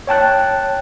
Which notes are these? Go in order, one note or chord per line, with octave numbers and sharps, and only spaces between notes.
C#5 G5 A5 F#6